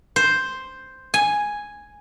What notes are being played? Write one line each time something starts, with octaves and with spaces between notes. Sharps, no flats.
C5
G#5